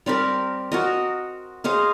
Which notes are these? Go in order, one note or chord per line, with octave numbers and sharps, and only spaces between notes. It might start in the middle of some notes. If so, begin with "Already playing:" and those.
G3 C4 G4 A#4
F#4 A#4 D#5
G#4 C5 D#5 F5